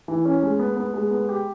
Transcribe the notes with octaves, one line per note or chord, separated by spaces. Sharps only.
E3
C#4
G#3
B3
B3
G#3
B3
G4